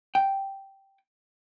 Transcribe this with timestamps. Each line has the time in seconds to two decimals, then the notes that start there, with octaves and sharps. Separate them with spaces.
0.15 G5